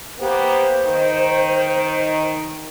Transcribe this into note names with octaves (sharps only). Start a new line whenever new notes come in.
A#3 B3 G4 C5
D#3